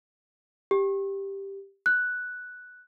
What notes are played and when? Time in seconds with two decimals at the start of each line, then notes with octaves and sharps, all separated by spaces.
0.71 G4
1.86 F#6